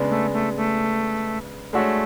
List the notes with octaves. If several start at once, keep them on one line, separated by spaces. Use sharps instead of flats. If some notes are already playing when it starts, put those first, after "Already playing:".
Already playing: C#3 G#3 B3 D4
A3
A3
A3
G#3 A3 D4 F#4 C#5